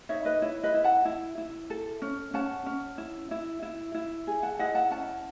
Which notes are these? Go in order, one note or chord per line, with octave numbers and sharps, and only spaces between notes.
D#4 C#5 E5
B4 D#5
E4 C#5
B4 D#5
E4
F#5 A5
E4
E4
A4
C#4
C#4 F#5 A5
C#4
E4
E4
E4
E4
G#4
F#5 A5
E4 D#5 F#5
F#5 A5
C#4 F#5 A5